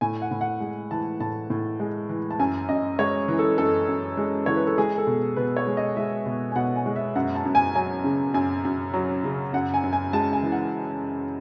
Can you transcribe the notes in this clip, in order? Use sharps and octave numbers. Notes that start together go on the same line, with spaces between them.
A2 G#5
F#5
A2
F#5
G#3
E3 A5
A2 A5
A2
G#3
E3
A5
F#2 G#5
F#2 D#5
G#3 C#5
E3
A4
F#2 A4
F#2
G#3
E3 C#5
B4
A4
G#3 G#4
A4
B2
B2 B4
C#5
G#3
D#5
G#3 E5
B2
G#5
B2 F#5
G#5
G#3
E5
F#2 F#5
A5
F#2
G#5
F#3 G#5
C#3
F#2 G#5
F#2
F#3
C#3
F#2 F#5
G#5
F#2
G#5
G#3 A5
G#5
E3
F#5